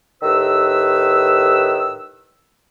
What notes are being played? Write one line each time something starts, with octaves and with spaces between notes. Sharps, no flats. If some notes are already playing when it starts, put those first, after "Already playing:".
A2 D#3 G4 B4 E6